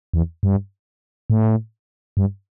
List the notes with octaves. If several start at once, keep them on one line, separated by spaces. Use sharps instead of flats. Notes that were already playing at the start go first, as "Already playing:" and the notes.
E2
G2
A2
G2